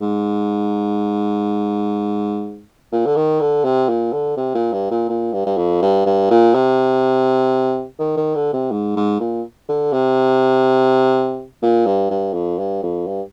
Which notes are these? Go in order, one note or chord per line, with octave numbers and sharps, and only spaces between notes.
G#2
A#2
D3
D#3
D3
C3
A#2
D3
C3
A#2
G2
A#2
A#2
G2
G2
F2
G2
G2
A#2
C3
D#3
D#3
D3
C3
G#2
G#2
A#2
D3
C3
A#2
G2
G2
F2
G2
F2
G2